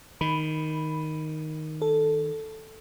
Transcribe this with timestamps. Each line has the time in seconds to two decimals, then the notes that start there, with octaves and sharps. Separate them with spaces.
0.21 D#3 B5
1.82 A4